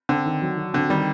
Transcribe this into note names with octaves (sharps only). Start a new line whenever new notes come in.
D3 C4
D#3
F#3
F#4
D3 C4
D#3 G3